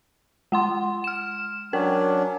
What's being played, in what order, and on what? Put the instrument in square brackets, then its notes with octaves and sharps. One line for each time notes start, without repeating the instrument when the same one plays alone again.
[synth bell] G#3 F#5 C6
F6 E7
[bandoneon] F#3 C#4 D4 [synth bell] A#4